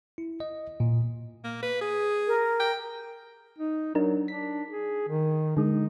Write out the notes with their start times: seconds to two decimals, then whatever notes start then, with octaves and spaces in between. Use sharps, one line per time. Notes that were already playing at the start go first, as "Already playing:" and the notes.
0.18 E4
0.40 D#5
0.80 A#2
1.44 A#3
1.62 B4
1.81 G#4
2.27 A#4
2.60 G5
3.58 D#4
3.95 F#3 D4 D#4 A#4
4.28 D4 B6
4.70 G#4
5.09 D#3
5.57 D3 G#3 D#4